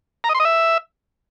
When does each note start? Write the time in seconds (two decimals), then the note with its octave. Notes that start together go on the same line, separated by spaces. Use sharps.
0.24 A#5
0.29 D#5
0.34 C6
0.40 D#5
0.45 E5